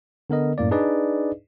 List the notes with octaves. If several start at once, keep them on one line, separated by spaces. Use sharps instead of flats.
D3 B3 A#4 D#5
F#2 A2 A#3 D5
D4 D#4 G#4 B4 D5 D#5